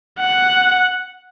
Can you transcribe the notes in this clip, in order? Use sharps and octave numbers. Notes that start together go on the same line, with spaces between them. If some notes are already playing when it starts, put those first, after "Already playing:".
F#5